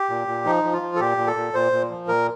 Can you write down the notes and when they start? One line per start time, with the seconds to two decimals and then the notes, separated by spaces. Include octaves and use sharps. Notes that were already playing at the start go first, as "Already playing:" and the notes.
Already playing: G4
0.10 A#2
0.28 A#2
0.45 F3 D#4
0.64 F3
0.73 F4
0.82 F3
0.96 A4
1.00 A#2 G4
1.17 A#2
1.27 A4
1.36 A#2
1.54 A#2 C5
1.72 A#2
1.90 F3
2.08 A#2 A#4